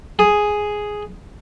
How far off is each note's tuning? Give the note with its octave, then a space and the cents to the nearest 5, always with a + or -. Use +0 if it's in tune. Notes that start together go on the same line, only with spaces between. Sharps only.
G#4 +0